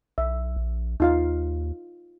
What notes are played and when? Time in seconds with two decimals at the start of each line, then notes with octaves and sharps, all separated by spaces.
0.18 B1 E5
0.56 A#1
1.00 D#2 D#4 F4 F5